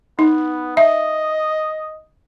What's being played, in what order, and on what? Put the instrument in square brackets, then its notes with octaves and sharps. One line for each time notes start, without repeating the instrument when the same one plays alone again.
[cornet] B3 [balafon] D#4
[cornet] D#5 [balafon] E5